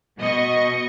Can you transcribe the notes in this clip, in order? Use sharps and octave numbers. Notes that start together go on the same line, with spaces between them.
B2 D#5 C#6